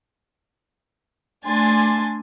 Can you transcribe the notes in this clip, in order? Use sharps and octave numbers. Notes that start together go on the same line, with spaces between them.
A3 D4 G#5 C6 A6